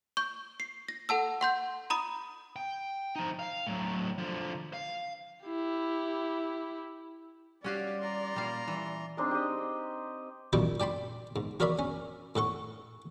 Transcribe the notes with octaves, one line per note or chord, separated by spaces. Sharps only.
C#6 G6
C7
A#6
A4 F#5 A5 E6
F#5 C6 G6
A#5 B5 D#6
G5
F3 D#4
F5
A2 F#3
D3 F3
F5
E4 G4
G3 C#4 F#4 G4 D5 F5
A#5 C6
A#2 G3 F5
E3 G3
C4 D4 D#4 G#4
G4 D#5
F#2 A#2 D#3 G3 D#4 E4
D5 G5 A5 B5 C6
G#2
F#4 A#4 C#5 D5 E5 B5
C#4
A2 A4 F#5 C#6